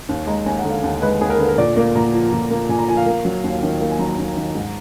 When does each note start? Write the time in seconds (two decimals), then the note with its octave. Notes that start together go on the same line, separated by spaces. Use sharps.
0.09 D#2
0.27 G#3 A#5
0.46 D#2 G#5
0.59 F#5
0.65 D3
0.71 F5
0.83 D#2
1.02 G#3 B4
1.21 D#2 G#4
1.30 A#4
1.39 D3 B4
1.48 A#4
1.58 A#2 D5
1.76 A#3 D5
1.95 A#2 A#5
2.13 F3
2.32 A#2
2.50 A#3
2.69 A#2 G#5
2.78 A#5
2.88 F3 G#5
2.97 F5
3.06 A#3
3.25 F#3
3.44 D#2
3.63 D#3
3.81 A#3 F5
3.90 G#5
3.99 F#3 A#5
4.09 A#5
4.18 D#2
4.37 D#3
4.55 G#2